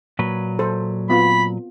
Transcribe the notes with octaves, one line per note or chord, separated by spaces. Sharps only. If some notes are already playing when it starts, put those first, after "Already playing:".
A#2 F#3 B4
A4 C5
B3 C4 F4 B5